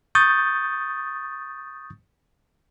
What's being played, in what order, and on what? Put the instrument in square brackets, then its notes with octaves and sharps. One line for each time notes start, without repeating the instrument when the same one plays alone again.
[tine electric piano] C#6 D#6 G6 A6